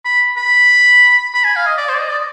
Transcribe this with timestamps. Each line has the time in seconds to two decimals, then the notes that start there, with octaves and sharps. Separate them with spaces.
0.05 B5
0.37 B5
1.35 B5
1.45 G#5
1.56 F5
1.66 D#5
1.78 D5
1.89 C5
1.94 D5
1.99 D#5
2.10 D5